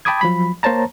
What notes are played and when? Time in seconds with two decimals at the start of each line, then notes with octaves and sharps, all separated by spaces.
0.05 G5 A5 B5 D6 D#6 G#6
0.21 F3 F#3 B5
0.63 A#3 C5 C#5 A5 A#5